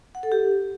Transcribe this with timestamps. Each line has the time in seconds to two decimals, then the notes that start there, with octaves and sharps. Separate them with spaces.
0.15 F#5
0.23 A4
0.32 G4